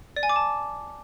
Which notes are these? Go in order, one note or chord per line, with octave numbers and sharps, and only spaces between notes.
D5
G#5
D6
A5